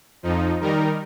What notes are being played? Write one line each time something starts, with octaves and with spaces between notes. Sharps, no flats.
F2 F3 D#4
D#3 G3 D#4 A#4